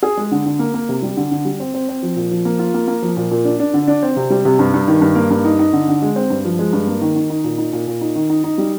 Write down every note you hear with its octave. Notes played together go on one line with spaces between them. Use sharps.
G#4
G#3
D3
D3
A#3
A#3
C3
G3
D3
D3
G3
C4
C4
C4
F3
A#2
F3
A#3
F4
A#3
A#3
F3
A#2
A#2
D4
D4
D3
D4
C4
C3
G3
C3
G2
G2
D#3
G2
A#3
G2
D#4
D#4
D3
D3
G#3
C4
G2
F3
G#3
G2
A#3
D#3
D#3
D#4
A#2
D#4
A#2
A#2
D#4
D#3
D#4
D#4
G3